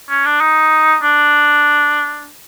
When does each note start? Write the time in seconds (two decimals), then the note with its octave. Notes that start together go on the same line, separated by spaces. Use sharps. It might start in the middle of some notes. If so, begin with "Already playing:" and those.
0.09 C#4
0.25 D4
0.41 D#4
1.03 D4